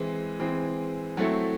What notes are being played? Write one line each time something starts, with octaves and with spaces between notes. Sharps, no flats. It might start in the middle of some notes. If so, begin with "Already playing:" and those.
Already playing: E3 G#3 C4
E3 G#3 C4
F#3 A3 C4 E4 A4